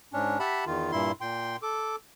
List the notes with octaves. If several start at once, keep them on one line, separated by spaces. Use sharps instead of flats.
G#2 C#4 D4
G4 E5 F#5 A5 B5
E2 D#3 F4
G2 A#2 E4 C6
A#2 G5 C6
A4 D6